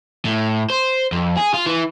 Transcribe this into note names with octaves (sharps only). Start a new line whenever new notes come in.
A2
C5
F2
G#4
F4
E3